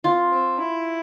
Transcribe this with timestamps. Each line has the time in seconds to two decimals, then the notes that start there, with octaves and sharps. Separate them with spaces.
0.04 C4 F4
0.31 C4
0.59 E4